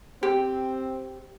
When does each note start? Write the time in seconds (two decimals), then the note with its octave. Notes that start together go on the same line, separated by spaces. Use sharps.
0.23 C4 G4